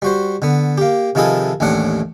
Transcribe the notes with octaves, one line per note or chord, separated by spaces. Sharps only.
G3 F#4 C5
D3 B3
A#3 G4
C3 D#3 F3 E4 G#4 A4
A1 D#2 A2 D4 F#5